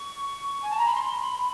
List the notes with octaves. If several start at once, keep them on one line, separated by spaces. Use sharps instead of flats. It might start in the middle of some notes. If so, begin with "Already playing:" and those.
Already playing: C#6
G#5
A5
A#5
B5
C6
B5